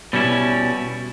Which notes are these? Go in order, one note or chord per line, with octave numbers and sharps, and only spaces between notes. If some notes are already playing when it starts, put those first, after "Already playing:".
B2 G3 C#4 E4